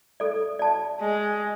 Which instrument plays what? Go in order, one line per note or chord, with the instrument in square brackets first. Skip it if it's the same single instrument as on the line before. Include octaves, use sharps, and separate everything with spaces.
[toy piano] A4 D5
D5 A5
[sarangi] G#3